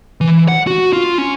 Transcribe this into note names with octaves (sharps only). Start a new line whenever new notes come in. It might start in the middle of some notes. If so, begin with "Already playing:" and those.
E3
F#5
F#4
F4
C#4